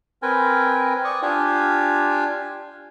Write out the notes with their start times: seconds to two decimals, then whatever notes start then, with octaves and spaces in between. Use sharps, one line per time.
0.22 C4 A#4 B4 G5 G#5
1.04 D5 C#6 D#6
1.22 D4 F4 G4 F5 G5 G#5